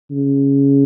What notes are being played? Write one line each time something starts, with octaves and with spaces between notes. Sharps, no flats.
C#3